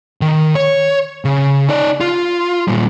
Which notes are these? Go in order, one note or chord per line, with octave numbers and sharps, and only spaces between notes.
D#3
C#5
C#3
D#4 D5
F4
A#2 G3